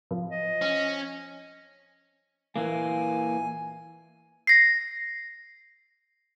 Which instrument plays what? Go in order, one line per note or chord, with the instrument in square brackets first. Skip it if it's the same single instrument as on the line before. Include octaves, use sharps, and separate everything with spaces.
[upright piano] F3
[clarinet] D#5
[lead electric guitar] C#4
[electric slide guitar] A#2 E3 A#3 [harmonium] G#5
[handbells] A#6 C7